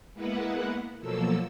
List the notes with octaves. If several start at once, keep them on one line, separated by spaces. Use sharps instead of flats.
G#3 A#3 B3 E4 B4 F#5
B2 F3 F#3 A#3 A4 E6